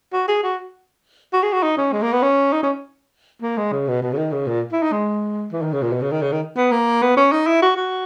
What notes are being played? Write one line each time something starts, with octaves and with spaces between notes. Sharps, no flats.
F#4
G#4
F#4
F#4
G#4
F#4
D#4
C#4
G#3
A#3
B3
C#4
D#4
C#4
A#3
G#3
C#3
B2
B2
C#3
D#3
C#3
A#2
E4
D#4
G#3
E3
D#3
C#3
A#2
B2
C#3
D#3
C#3
D#3
B3
A#3
B3
C#4
D#4
E4
F#4
F#4